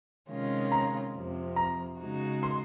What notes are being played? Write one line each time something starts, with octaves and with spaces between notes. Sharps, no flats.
C3 D#3 G#3 C#4 F4
A#5
F2 C3 F3
A#5
C#3 G#3 D#4 F#4
C6